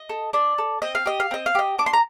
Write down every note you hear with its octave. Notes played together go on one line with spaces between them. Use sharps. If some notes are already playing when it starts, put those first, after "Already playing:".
Already playing: D#5
A4
D4 D5
A4
C4 D#5
F5
G4 D#5
F5
C4 D#5
F5
G4 D#5
D4 D6
C6
A#5